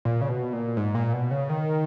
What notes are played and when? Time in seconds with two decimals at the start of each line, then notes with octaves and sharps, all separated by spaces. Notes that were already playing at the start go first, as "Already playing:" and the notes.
0.05 A#2
0.21 C#3
0.29 B2
0.53 A#2
0.77 G#2
0.95 A#2
1.13 B2
1.31 C#3
1.49 D#3